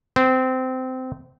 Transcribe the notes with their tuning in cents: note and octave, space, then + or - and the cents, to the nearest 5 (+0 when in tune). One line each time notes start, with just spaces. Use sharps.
C4 -20